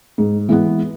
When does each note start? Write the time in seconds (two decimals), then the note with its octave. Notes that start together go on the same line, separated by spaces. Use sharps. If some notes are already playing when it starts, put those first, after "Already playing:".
0.18 G#2
0.49 E3 G#3 B3